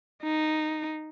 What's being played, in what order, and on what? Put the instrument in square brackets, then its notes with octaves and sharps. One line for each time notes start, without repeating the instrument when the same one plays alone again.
[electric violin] D#4